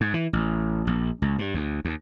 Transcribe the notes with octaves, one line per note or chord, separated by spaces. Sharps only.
G#2
E3
A1
A#1
C#2
G2
D2
D#2